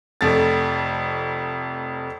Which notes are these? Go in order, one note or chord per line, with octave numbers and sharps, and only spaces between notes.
F1 F2 A3 A6